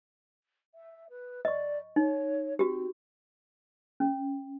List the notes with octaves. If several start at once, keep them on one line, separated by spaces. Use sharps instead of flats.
E5
B4
D5 D#5 C#6
D#4 C#5
C4 F#4 G4
C#4